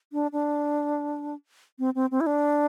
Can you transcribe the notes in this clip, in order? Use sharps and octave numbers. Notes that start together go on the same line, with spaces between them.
D4
D4
C4
C4
C4
E4
D4